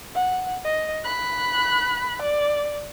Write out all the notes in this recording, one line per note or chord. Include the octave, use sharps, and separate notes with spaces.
F#5
D#5
B5 F#6
D5